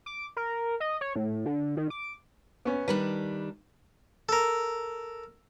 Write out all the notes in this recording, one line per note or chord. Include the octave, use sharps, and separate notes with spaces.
D6
A#4
D#5
C#5
A2
D3
D#3
D6
B3 C#4
D#3 G3 D4 B4
A4 A#4